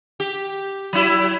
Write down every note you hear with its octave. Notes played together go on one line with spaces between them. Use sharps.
G4
F#3 E4